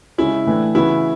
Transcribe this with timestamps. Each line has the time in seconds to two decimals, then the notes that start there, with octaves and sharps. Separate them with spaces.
0.18 C#3 G#3 C#4 E4
0.46 A2 E3 A3 D4
0.75 C#3 E3 B3 E4 F#4